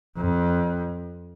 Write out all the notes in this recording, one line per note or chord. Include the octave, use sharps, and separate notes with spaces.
F2